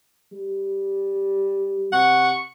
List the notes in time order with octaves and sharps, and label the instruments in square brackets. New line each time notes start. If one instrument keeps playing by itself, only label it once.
[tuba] G3
[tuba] C3 [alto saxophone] F#5 [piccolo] C#6